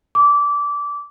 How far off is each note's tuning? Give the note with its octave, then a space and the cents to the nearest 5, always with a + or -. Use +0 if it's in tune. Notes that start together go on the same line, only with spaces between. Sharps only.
D6 -20